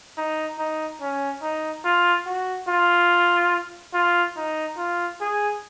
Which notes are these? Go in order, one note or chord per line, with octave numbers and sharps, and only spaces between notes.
D#4
D#4
C#4
D#4
F4
F#4
F4
F4
D#4
F4
G#4